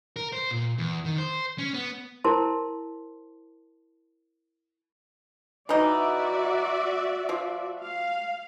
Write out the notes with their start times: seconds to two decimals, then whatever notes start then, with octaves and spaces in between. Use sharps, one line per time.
0.16 A#4
0.32 C5
0.51 A#2
0.78 E2
1.05 D#3
1.18 C5
1.58 C#4
1.74 B3
2.24 E4 A#4 C5 A5 C6
5.69 E3 D#4 F#4 D5 E5
7.29 F3
7.82 F5